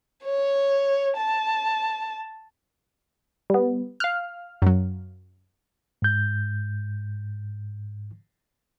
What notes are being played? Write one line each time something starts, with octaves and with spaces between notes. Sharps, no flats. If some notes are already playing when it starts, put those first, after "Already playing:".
C#5
A5
G3 B3
F5 F6 F#6
F#2 F#3
G#2 G6